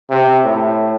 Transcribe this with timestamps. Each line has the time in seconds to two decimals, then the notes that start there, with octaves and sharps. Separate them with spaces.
0.10 C3
0.45 A2